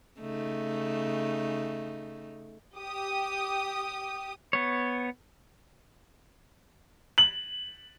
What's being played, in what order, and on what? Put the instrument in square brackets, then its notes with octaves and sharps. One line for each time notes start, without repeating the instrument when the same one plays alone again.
[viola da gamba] C#3 A3 D#4
[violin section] G4 D#6
[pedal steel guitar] B3 C#5
[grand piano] F#7